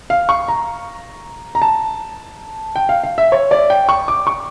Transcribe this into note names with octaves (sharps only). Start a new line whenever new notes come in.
F5
C#6
A#5
A#5
A5
G5
F5
F5
E5
C#5
D5
G5
C#6
D6
C#6